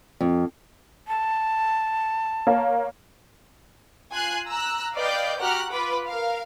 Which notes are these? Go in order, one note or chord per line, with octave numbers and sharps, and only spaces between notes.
F2
A5
A#3 C#5
F4 G#5 F#6 C7
A#5 E6 F#6
B4 D5 D#5 F5 G5 G6
F#4 G4 F#5 A#5 F6 F#6
F4 B4 B5 D6
A#4 F5